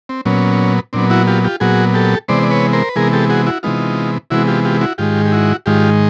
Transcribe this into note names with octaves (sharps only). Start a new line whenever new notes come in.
C4
A#2 F#3 B3 C#4
A#2 F#3 B3 C4 D4
E4 F#4
F4 G4
F4 G4
A#2 F#3 B3 F#4 G#4
G4 A4
C3 E3 G#3 B3 C5 D5
D5
B4 C#5
A#4 C5
B4
C3 E3 G#3 B3 G#4 A#4
G4 A4
F#4 G#4
E4 F#4
C3 E3 G#3 B3 D#4 F4
C3 E3 G#3 B3 E4 F#4
F4 G4
F4 G4
E4 F#4
G#2 D#3 G#3 F4 G4
G4
E4 F#4
G#2 D#3 G#3 F4 G4